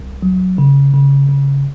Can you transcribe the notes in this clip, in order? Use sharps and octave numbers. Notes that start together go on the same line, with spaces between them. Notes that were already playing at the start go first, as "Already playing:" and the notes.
Already playing: C2
F#3
C#3
C#3
C#3